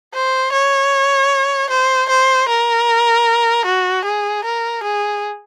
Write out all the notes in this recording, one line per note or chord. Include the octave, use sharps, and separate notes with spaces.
C5
C#5
C5
C5
A#4
F#4
G#4
A#4
G#4